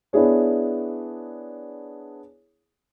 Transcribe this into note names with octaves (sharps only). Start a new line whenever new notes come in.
B3 D4 E4 G#4 C#5